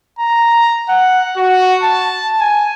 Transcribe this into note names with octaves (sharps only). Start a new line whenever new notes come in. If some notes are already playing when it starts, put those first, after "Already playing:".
A#5
F#5
F#4
A5
G#5